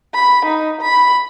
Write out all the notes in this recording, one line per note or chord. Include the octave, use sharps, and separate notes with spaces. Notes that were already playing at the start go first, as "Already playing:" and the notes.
B5
D#4
B5